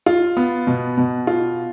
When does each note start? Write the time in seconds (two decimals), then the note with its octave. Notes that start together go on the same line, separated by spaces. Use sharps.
0.06 F4
0.37 B3
0.67 B2
0.97 B2
1.27 F4